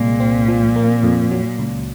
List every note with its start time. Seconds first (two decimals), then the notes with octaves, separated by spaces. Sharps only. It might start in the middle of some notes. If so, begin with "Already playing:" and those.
Already playing: C2 A#2 G#3
0.20 C4
0.48 F3
0.76 A#3
1.03 F2
1.31 F#3
1.59 C#2